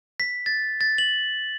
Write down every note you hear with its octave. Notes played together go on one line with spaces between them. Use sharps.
B6
A6
A6
F#7